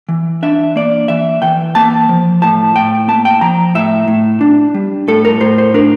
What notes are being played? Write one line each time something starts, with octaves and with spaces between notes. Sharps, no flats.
E3
D4 E5
A#3 D5
E3 E5
E3 G5
A#3 A5
F3
A2 A5
A2 G5
A#3 A5
G5
F3 A#5
A2 E5
A2
D4
G3
A2 A4
A#4
A2 C5
C5
D4 A#4